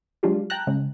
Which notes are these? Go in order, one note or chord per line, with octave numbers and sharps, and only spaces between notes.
F#3 G#3 D4 F4 G4
G5 A5 A#5 F#6
C#3 G#3